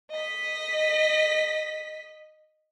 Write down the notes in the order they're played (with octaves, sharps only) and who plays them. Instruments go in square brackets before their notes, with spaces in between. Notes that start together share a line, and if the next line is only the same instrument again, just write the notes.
[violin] D#5 B6